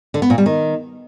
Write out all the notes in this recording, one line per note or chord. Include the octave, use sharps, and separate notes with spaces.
D3
B3
A#2
G3
D#3